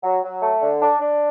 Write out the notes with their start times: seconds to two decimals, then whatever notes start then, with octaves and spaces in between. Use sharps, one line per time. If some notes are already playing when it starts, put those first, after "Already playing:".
0.04 F#3
0.23 F#3
0.42 A3
0.61 D3
0.81 D4
1.01 D4